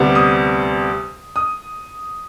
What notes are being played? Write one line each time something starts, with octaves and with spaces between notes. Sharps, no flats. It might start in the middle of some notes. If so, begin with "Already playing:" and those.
Already playing: D2 C3 G3 B3
D#6
D#6